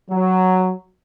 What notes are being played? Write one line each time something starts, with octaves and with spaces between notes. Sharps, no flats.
F#3